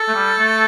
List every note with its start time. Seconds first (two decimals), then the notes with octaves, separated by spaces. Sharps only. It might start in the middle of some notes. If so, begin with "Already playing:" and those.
Already playing: A4
0.08 A3
0.14 G3
0.39 A3